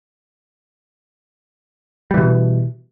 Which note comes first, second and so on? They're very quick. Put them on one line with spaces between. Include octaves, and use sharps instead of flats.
G3 E3 B2